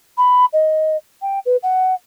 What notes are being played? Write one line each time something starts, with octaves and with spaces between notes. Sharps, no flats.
B5
D#5
G5
B4
F#5